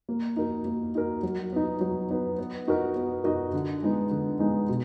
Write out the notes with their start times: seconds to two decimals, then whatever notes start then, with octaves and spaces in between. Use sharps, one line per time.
0.09 A#3
0.36 D#4 F#4 A#4
0.65 A#3
0.95 D#4 F#4 A#4
1.23 F#3
1.52 B3 D#4
1.81 F#3
2.10 B3 D#4
2.39 B3
2.68 D#4 F#4 A#4 D#5
2.96 B3
3.24 D#4 F#4 A#4 D#5
3.53 D3
3.82 G#3 B3 D#4
4.11 D3
4.39 G#3 B3 D#4
4.69 B2